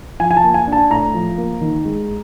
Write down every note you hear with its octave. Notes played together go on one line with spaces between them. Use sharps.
F3 G#5
G#5
A5
A#3
G#5
D4
A5
A2 A#5
F3
A#3
D#3
G#3